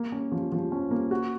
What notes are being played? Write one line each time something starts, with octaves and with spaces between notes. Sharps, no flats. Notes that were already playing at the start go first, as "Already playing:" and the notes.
Already playing: A#3
C#4
F3
F3
C#4
A#3
F#4